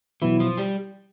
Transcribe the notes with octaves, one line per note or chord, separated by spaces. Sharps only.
B2 E3 F#3 B3 E4
F3
G3